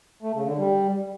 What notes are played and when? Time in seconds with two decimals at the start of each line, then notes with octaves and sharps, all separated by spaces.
0.23 A3
0.34 C#3
0.46 D3
0.58 G3